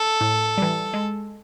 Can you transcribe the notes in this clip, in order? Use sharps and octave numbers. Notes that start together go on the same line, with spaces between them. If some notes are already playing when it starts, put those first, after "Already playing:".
Already playing: A4
A2
E3 G3
G#3